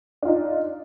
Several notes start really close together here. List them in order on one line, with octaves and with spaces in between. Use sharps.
D4 F4 D#4